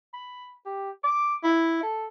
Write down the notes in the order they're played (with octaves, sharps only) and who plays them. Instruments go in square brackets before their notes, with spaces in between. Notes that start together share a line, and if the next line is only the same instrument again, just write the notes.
[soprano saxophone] B5
G4
D6
E4
A4